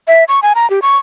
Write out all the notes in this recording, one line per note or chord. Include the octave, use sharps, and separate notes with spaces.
E5
C#6
G#5
A#5
G4
C#6